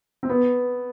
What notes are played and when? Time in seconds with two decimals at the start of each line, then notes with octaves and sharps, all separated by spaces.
0.23 C4
0.29 B3